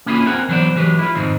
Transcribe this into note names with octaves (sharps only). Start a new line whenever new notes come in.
A#3 C#4 E4 F4 G#4
C4 A#4 F#5 G#5
E3 F#3 B3 A#4 C5 D5
E3 F#3 G#3 G4 B4
E4 F4
F2 G#2 D#3 C4